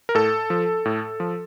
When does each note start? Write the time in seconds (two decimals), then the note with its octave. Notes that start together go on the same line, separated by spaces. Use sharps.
0.09 A#4
0.15 A2 A4
0.50 F3
0.85 A2
1.20 F3